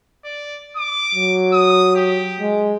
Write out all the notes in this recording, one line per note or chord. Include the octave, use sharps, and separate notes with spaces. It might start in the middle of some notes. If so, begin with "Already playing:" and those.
D5
D6
F#3
D#6
G4
G#3